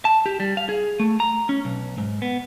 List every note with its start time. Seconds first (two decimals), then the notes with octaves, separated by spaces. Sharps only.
0.05 A5
0.26 G4
0.40 G3
0.57 F5
0.69 G#4
1.00 A3
1.20 A#5
1.49 C#4
1.65 B1
1.98 G#2
2.22 B3